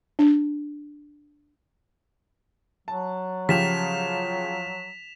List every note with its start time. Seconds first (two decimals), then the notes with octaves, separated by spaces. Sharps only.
0.19 D4
2.88 F#3 A5
3.49 C#3 F3 G4 B6 E7 F7